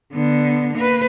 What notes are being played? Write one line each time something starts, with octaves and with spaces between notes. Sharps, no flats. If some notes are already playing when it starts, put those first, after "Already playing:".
D3 B3
A#3 B4